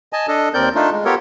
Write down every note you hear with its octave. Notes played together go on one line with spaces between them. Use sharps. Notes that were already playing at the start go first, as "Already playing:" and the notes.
D#5 G#5 A5
D4 A4 D#5
D#2 C4 A#4 D5 G6
A3 D4 D#4 F4
G#3
B3 F4 G4 A4 A#4 C#5